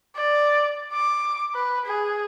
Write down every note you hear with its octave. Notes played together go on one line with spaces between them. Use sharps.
D5
D6
B4
G#4